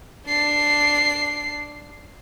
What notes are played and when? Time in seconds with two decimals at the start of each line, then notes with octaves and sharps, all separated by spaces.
0.26 D4 C7